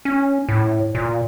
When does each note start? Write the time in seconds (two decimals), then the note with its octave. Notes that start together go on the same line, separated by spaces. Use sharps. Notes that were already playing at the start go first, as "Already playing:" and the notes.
0.05 C#4
0.49 A2
0.95 A#2